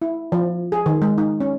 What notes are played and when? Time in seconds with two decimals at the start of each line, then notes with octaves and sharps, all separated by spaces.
0.02 E4
0.32 F3
0.72 G#4
0.86 D#3
1.02 G#3
1.18 D#4
1.41 C#4